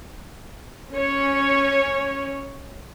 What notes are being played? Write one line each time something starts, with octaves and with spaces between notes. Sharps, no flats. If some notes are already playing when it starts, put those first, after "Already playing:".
C#4 C#5